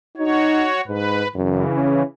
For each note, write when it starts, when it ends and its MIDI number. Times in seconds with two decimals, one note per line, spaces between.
0.17 0.67 63
0.17 0.81 66
0.17 0.81 73
0.87 1.23 44
0.87 1.28 71
1.35 1.64 42
1.35 2.03 49
1.35 2.03 52
1.73 2.03 61